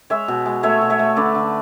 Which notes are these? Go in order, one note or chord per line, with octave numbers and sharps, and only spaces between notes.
G#3 C#5 E5
B2
G#3
A3 C#5 E5
B2
C#5 E5
A3
D3 B4 D5
D3